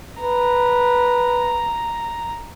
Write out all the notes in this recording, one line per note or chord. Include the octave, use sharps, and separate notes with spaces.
B4 A#5